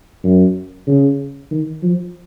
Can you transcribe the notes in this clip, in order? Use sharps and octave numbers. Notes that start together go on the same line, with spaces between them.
F#2
C#3
D#3
F3